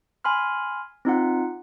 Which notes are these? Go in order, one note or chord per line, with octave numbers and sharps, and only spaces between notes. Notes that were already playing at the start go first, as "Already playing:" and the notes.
G#5 B5 C6 F6
C4 D#4 F4 F#5